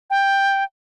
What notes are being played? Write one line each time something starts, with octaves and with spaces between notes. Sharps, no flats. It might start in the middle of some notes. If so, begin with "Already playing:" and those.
G5